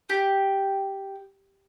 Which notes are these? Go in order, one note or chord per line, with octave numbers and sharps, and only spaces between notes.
G4